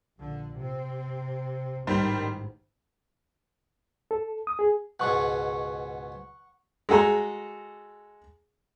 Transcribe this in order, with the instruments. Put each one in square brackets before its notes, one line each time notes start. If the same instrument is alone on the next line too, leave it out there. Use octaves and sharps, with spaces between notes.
[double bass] A#1 D3
C3 C4
[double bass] A1 G#2 [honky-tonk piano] D#3 G3 C5
[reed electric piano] A4
D#6
G#4
[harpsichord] C#2 G#2 B2 [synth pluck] F#5 C#6
[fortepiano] G#3 F#4 A4 G#5 A#5